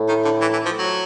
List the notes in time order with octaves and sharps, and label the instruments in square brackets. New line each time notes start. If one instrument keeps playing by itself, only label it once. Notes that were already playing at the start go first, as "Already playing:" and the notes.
Already playing: [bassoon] A2
[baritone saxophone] D#3
D3
E3
E3
F3
F#3